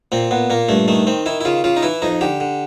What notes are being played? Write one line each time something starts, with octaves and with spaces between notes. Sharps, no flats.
A#2 C4
A#2 B3
A#2 A#3
G2 A3
D#3 A3
D#3 C4
D#3 E4
E4
C#3 F4
C#3 F4
D#4
E3 E4
F2 D#4
D3 G4
D3